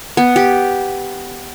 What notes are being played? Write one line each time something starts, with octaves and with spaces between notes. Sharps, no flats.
B3
G4